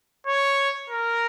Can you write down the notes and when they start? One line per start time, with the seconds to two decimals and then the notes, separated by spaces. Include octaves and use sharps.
0.27 C#5
0.90 A#4